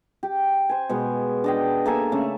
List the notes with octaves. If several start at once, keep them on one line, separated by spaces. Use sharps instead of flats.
G4
C5 G#5
B2 G#3 B4
D4 D#5 G5
A#3 A4 E5 G#5
C#3 A3